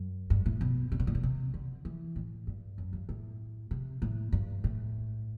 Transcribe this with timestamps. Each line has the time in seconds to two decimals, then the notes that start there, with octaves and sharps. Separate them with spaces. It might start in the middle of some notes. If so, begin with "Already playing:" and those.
Already playing: F#2
0.30 G2
0.46 A2
0.61 B2
0.92 C3
1.00 B2
1.07 A2
1.15 B2
1.23 C3
1.54 D3
1.85 E3
2.16 A2
2.47 G2
2.78 F#2
2.93 G2
3.09 A2
3.71 C3
4.02 A2
4.32 G2
4.64 A2